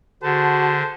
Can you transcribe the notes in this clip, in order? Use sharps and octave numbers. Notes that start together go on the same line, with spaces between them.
D3 F#4 G#4 C5 A5